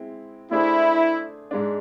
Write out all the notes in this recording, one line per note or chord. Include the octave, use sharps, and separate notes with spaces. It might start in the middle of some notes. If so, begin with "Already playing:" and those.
Already playing: G#3 C4 E4
A3 D4 E4 G#4 C5
G#2 G#3 D4